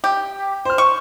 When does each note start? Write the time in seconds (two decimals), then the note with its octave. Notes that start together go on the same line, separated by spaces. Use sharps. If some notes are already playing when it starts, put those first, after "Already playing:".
0.04 G4
0.65 C5 F6
0.78 C#6